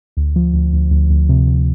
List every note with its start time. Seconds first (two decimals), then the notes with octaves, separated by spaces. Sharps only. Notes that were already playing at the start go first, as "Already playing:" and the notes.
0.17 D2
0.36 F3
0.54 D2
0.73 D2
0.91 D2
1.10 D2
1.29 C3
1.47 C3